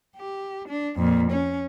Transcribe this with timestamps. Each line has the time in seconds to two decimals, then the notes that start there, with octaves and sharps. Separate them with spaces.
0.16 G4
0.68 D4
0.97 F2 A#2
1.31 C#4